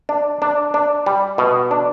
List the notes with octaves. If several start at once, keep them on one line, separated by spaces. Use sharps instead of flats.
D4
D4
D4
G3
B2
D4